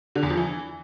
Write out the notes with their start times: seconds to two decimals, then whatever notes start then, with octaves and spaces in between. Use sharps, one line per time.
0.15 D3
0.23 E2
0.30 F3
0.37 E3